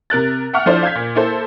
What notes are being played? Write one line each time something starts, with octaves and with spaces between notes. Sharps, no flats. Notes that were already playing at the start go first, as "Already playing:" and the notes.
C3 A#4 F#6 A6
E5 F#5 G5 C#6 F6
F3 D4 E4 A4 C5 D5
F5 G6 G#6 B6
A#2
A#3 E4 A4 C5